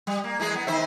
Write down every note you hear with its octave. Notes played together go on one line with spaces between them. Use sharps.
G3
A#3
E3 G#3 G#4
B3
D#3 C5 E5